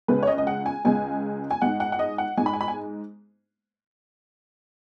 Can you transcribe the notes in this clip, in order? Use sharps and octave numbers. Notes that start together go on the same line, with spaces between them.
C#2 C#3 G#3 B4
C#5
D#5
D#5
F#5
G#5
C#2 C#3 G#3 G#5
G#5
G#2 G#3 F#5
F#5
F#5
D#5
F#5
G#2 G#3 G#5
B5
G#5
B5
G#5